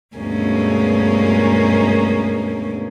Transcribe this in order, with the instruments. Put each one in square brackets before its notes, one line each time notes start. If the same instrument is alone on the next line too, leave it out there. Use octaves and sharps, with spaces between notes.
[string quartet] D2 G2 B2 G#3 A#3 C#4